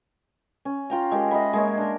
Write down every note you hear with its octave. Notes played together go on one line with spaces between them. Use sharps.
C#4
F4 G5 A#5
G#3 G4 A#4
D#5 E5 F#5 B5
G#3 A#3 C#5
D4 A#4